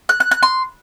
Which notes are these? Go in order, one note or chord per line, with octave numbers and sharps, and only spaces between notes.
F#6
F#6
F#6
C6